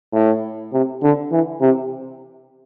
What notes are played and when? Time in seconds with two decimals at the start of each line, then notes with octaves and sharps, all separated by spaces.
0.13 A2
0.73 C3
1.02 D3
1.32 E3
1.61 C3